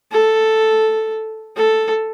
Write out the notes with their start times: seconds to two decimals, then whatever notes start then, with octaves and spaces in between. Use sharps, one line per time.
0.12 A4
1.56 A4